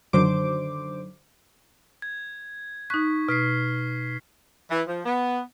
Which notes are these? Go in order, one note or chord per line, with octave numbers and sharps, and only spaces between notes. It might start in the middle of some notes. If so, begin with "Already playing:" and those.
F#2 D3 D#3 F#3 C5 D6
G#6
D#4 C#6 F#6 B6
B2 F6 B6 C7
E3
F3
B3